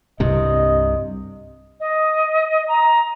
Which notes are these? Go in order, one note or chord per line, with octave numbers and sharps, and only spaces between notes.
C2 G2 C3 D#5
D#5
A#5